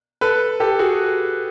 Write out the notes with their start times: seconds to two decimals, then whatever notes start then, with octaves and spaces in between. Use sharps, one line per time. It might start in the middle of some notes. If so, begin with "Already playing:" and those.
0.21 A4 B4
0.60 G4 A4
0.79 F#4 G#4